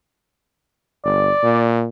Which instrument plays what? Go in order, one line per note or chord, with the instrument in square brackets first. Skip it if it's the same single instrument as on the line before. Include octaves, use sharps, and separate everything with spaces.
[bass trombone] G1 [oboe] D5
[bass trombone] A#2